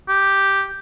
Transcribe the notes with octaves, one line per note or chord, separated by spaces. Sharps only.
G4